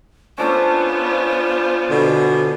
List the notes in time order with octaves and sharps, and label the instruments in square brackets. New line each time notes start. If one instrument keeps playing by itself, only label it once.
[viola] B3 F4 [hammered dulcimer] C#4 D4 A4 [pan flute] C5
[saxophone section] B2 D3